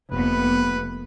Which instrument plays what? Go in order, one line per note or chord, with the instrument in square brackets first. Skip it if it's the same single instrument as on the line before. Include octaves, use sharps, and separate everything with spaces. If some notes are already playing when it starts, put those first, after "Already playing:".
[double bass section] F1 [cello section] A#3 B3 [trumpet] B4